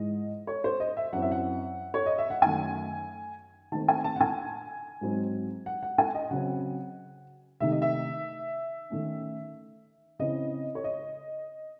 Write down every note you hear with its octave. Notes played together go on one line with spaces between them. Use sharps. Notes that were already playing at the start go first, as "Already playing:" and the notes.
Already playing: G#2 E3 G#3 D#5
C#5
C5
D#5
E5
F#2 E3 C4 F#5
E5
F#5
C#5
D#5
E5
F#5
F#2 D#3 A3 G#5
D#3 A3 C4 A5
G#5
A5
F#5
G#5
G#2 F#3 C4 D#4
F#5
F#5
G#5
D#5
C#3 F#3 C4 F#5
C3 D#3 A3 D#4 E5
D#5
E5
D#3 A3 C#4
C#3 E3 C4 E4 D#5
C#5
D#5